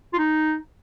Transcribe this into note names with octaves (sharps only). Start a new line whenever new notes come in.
F4
D#4